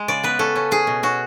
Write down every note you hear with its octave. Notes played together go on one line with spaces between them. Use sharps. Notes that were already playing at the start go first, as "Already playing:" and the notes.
Already playing: G#3
C#3 D5
B3 B4
C#4 A4
C#4
C#4 G#4
B2
C#4 F#4